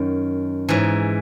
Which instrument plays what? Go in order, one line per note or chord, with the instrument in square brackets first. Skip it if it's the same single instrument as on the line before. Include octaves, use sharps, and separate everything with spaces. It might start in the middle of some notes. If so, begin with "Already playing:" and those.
Already playing: [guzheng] F#2 D#3
G#2 E3